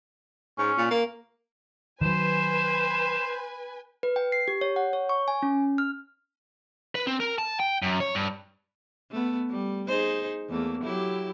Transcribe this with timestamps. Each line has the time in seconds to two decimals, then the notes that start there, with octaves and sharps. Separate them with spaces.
0.58 G#2 C#4
0.78 A#2
0.90 A#3
2.01 D#3 F#3 B4 C5 G#5 E7
4.03 B4
4.16 G5
4.32 C7
4.48 G4
4.61 C#5
4.76 F#5
4.93 C#5
5.09 C#6
5.28 G#5
5.42 C#4
5.78 F6
6.95 B4
7.07 C4
7.20 A#4
7.38 A5
7.60 G5
7.82 F#2
8.00 C#5
8.15 G2
9.11 A3 B3
9.50 G3
9.88 D#4 G#4 C5
10.49 E2 A3 A#3
10.83 F#3 E4 G4